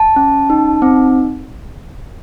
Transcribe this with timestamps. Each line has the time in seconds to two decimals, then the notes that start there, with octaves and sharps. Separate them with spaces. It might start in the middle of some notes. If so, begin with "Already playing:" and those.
Already playing: A5
0.16 C#4
0.50 D#4
0.82 C4